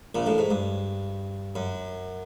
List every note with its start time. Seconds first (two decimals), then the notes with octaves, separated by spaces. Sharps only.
0.15 A#1 A#2
0.26 A1 A2
0.38 G#2
0.51 G2
1.56 F#2